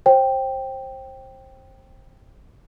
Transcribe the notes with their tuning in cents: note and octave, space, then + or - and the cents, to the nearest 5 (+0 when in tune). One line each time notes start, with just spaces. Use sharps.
C5 +25 G5 +0